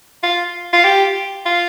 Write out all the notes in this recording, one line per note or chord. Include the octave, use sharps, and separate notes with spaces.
F4
F4
G4
F4